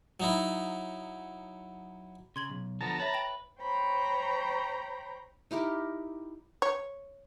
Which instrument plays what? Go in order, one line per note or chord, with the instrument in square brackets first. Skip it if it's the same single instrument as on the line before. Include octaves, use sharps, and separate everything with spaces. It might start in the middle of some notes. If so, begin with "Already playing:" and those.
[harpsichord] F#3 D#4 E4
[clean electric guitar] C#3 [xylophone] C6 G#6 F#7
[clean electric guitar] B1
[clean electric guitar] D3 F3 B3 [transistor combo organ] A5 A#5
[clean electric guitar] B4 [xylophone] C#5 E5
[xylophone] G5 F#7
[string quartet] C5 C#5 G5 A#5 B5
[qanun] D#4 E4 G4 A#4
[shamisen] C#5